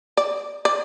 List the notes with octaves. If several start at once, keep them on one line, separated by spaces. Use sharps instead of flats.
D5
D5